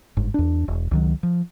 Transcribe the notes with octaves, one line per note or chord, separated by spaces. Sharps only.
G1 G#2
E2 D4
E1
C#2 D#3 F#3
F3